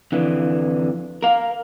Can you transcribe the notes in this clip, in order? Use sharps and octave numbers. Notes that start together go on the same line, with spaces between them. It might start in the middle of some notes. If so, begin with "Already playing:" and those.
F2 D3 E3
A#4 F5